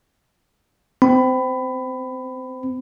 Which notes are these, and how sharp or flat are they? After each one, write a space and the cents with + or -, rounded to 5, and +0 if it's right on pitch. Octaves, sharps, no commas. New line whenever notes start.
C4 -20 B5 +20